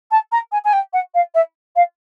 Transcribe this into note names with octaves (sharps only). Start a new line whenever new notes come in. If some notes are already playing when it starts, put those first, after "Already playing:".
A5
A#5
G#5
G#5
G5
F#5
F5
E5
F5